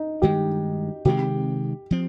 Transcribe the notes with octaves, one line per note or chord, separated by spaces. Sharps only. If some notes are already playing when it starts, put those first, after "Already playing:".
Already playing: D#4
G2 D#3 G#3 G4
C3 D#3 G#3 C4 G4
F3 C4